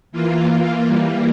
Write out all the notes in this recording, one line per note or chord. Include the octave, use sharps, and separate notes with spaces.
E3 A#3 F4
E3 G3 A#3